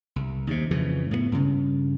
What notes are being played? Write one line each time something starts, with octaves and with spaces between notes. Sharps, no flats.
C2
D#2 C3
F2 C#3 E3
A2 F3 B3
G2 C#3